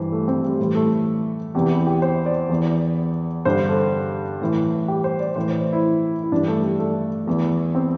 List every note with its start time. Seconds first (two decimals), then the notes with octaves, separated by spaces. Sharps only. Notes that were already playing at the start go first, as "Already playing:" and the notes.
Already playing: G2 E3 C5
0.12 A3
0.28 C4
0.44 G3
0.59 A2 E3 G3
0.75 A3
1.55 E2 C3 E3 G4
1.70 E4
1.87 G4
2.02 C5
2.26 D5
2.49 E2 E3
3.45 G2 D3 C5
3.69 A4
4.42 A2 E3
4.88 G4
5.04 C5
5.20 D5
5.36 A2 E3 C5
5.48 C5
5.73 E4
6.23 E4
6.32 G2 E3 D4
6.48 A3
6.63 G3
6.79 A3
7.27 E2 E3
7.75 C4